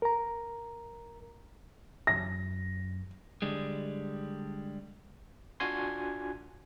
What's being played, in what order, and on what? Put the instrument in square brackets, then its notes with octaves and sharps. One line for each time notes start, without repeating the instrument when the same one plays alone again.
[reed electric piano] A#4 A#5
[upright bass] F#2 [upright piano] A#6
[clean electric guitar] D3 G3 G#3
[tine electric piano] D4 F4 F#4 G#5 C6